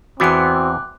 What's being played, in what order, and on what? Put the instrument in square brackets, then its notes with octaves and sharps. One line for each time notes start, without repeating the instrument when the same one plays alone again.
[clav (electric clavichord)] E2 E3 B3 [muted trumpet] C4 [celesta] F#4 [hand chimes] D6 F#6